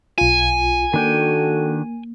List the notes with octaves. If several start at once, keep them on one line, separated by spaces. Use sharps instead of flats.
B1 F4 G#5
D#3 A#3 D4 F#4 A4 G5